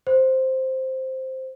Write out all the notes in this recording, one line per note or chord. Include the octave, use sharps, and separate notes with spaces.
C5